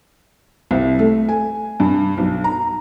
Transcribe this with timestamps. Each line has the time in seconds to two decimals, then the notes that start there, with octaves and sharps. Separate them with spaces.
0.71 C2
0.99 A3
1.29 G#5
1.80 G2
2.18 B1
2.44 A#5